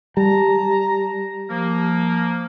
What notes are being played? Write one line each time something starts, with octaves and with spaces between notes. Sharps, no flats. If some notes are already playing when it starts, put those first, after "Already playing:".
G3 A5 A#5
F3 A#3